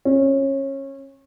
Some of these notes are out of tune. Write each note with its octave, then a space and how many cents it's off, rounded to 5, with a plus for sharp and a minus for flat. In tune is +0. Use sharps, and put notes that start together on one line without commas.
C#4 -25